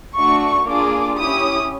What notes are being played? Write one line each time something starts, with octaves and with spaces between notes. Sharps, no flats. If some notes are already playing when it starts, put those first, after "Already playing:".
A3 D4 F#4 C#6
A#3 D4 F4 G#4 D6
C#4 E4 G4 D#6